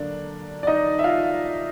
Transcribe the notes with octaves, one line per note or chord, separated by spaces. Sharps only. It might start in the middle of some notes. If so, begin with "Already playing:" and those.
Already playing: D3 F#3 A#3 D4
D5
D#4 D#5
E5
F4 F5